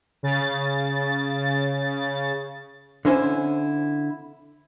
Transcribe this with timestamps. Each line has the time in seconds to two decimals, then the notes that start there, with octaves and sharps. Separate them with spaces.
0.23 C#3 A6
3.05 D3 C4 C#4 E4 C5 G#5